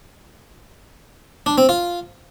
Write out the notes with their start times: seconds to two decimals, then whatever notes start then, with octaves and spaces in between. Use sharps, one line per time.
1.46 D4
1.58 C4
1.69 F4